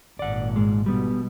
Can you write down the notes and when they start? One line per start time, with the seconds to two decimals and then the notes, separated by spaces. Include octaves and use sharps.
0.19 G#1 A#2 D5 F#5
0.56 G#2 G#3
0.86 B2 G3 B3